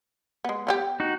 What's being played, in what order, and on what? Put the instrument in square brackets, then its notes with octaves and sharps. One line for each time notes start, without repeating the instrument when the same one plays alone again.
[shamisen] G#3 B3
B3 F4 G4
[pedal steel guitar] D#4 F#4